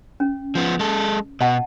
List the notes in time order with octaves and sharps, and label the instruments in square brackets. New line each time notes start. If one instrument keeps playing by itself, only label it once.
[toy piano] C#4
[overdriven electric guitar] F3 B3
G#3 A4
[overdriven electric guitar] B2 [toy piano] D#5 F#5 A5